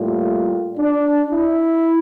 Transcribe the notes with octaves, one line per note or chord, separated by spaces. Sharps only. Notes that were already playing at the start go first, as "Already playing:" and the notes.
Already playing: A2 G3 A#3 F4
D4
E4